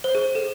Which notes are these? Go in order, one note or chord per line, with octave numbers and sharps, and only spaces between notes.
C5
G#4
A4